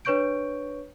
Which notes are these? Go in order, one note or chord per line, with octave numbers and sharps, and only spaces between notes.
D4 B4 C#5 C#6 G6 D7